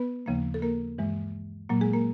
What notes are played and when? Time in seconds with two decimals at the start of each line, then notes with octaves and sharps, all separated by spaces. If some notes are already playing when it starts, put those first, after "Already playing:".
Already playing: B3 B4
0.26 D#2 C#3 F3 A#3
0.54 A4
0.62 A#3 A#4
0.98 G2 E3 G#3
1.69 A#2 F#3 A#3
1.81 G#3 G#4
1.93 A#3 A#4